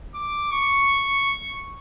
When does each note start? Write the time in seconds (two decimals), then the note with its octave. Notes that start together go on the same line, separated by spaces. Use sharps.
0.14 D6
0.51 C#6